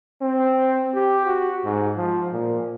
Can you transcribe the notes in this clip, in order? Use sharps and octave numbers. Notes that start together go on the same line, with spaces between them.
C4
G4
F#4
G#2
F3
A#2